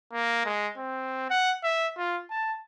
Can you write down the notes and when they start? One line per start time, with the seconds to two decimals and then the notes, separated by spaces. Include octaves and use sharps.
0.12 A#3
0.45 G#3
0.77 C4
1.30 F#5
1.63 E5
1.97 F4
2.30 A5